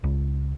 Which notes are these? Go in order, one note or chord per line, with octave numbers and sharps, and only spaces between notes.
C#2